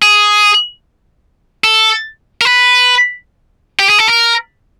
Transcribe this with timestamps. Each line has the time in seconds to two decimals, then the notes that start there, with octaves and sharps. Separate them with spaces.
0.02 G#4
1.64 A4
2.41 A#4
2.45 B4
3.79 G4
3.89 G#4
3.99 A4
4.08 A#4